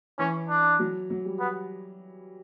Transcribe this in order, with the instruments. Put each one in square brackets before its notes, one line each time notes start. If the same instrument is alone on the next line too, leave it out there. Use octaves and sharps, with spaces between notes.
[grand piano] E3 [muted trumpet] C#4
[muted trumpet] D4
[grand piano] F#3
F#3
G3
[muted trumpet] B3